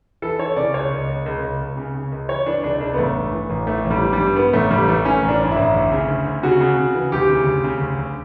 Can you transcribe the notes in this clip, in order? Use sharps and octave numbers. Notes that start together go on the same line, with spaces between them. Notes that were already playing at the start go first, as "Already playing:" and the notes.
E3 A4
E3 C#5
C#3 D5
C#2 C#5
C#2
C#2
C#2
C#2
C#2
C#3
C#3
C#2
E3 C#5
E3 D4
C#2 D4
C#2 D4
B3
A1 A3
G2
E3
A1
E3 A3
A1
G3
E3
G3
G2
G2 B3
A1 A3
A1 G3
E3 A3
E3 C#4
A1
D4
G2
E4
A1
D2
C#3
D2
D2
C#3 F#4
C#3
C#3
E3
D2 G4
C#3
D2
C#3
D2
D2